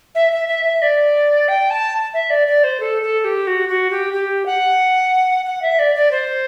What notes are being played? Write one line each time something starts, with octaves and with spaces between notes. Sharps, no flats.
E5
E5
E5
E5
D5
G5
A5
E5
D5
D5
C5
A4
A4
G4
F#4
F#4
G4
G4
F#5
F#5
E5
D5
D5
C5